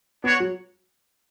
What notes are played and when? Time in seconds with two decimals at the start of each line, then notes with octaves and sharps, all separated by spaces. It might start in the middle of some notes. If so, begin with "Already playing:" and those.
0.24 B3 D4 F#4 C#5 F#5
0.40 F#3